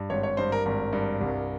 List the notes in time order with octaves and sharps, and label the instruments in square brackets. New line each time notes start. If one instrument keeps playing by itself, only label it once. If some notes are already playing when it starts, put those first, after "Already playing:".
Already playing: [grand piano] G2
G#1 C#5
C#5
G2 C5
A#4
G#1 A#4
G2
C2